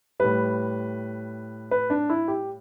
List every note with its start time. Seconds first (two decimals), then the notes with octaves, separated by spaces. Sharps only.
0.20 A2 G3 B4
1.71 B4
1.90 D4
2.10 E4
2.28 G4